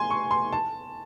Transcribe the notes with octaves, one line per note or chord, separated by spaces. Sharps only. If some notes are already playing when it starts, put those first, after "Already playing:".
Already playing: G#5 C6
C#6
C6
A5